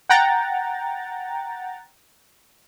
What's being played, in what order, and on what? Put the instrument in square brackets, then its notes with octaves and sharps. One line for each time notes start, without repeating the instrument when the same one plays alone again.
[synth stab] F#5 G5 A#5 A6